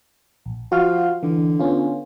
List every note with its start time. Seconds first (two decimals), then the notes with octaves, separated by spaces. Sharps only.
0.46 A#1
0.72 F3 F#4 F5
1.23 D3 E3
1.59 B3 C#4 F4